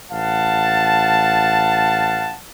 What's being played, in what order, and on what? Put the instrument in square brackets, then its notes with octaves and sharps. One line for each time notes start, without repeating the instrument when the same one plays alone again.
[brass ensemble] A1 F5 F#5 A5